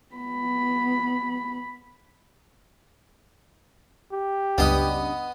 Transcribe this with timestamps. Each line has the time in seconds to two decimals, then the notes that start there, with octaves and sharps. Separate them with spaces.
0.15 B3 B5
4.12 G4
4.58 C#2 F#2 C#3 G3 B3 D4 D#5